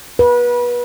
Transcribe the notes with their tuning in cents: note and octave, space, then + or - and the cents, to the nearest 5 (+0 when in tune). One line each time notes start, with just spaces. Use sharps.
B4 -30